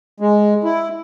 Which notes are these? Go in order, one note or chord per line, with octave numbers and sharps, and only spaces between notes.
G#3
E4